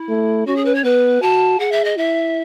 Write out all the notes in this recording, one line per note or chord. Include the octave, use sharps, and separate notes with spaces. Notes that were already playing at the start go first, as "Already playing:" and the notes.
Already playing: E4
A3
C#4 F#4
G#4
B4
C#5
B3 B4
F#4 A5
G#4 F#5
E5
D#5
E4 E5